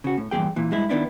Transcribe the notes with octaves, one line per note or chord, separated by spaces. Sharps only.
C#3 F#4
A2
E2 G2 A#2 F3 G#4 G5
A#2 E3
G2 G#3 E4
D#3 B3 D4 E4